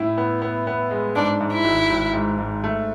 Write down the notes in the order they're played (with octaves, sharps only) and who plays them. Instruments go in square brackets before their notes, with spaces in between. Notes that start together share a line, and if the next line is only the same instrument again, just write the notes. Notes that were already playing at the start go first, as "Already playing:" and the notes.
Already playing: [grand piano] A2 E4
B3
B3
B3
G#3
[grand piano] G#2 [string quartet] D4
[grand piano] G#2
[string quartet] E4
[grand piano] G#1
G#1
G#2
G#2
A3